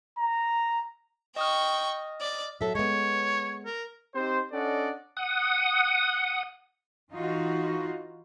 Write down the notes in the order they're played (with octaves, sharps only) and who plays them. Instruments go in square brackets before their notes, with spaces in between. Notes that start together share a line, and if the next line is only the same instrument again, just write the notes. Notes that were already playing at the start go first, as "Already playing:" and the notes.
[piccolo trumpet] A#5
[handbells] D#5 D#6 F6 [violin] G5 C#6
[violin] D5
[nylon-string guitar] F#3 A4 [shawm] E5
[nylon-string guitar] G#3 B3 [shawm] C#5
[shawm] A#4
[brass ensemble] C4 D#4 G4 C5
C#4 D4 A4 D5 D#5 F#5
[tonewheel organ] F#5 D#6
[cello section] E3 D#4 F4 F#4